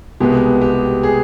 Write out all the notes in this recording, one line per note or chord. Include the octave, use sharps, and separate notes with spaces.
C2 B2 G#3 B3 G4
G4
G#4